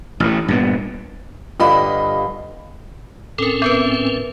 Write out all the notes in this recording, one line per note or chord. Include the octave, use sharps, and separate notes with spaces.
A1 A2
G2 A#2 B3
G2 D3 F4 D#5 B5
A2 C4 C#4 A4 A#4
B3 A#4 B4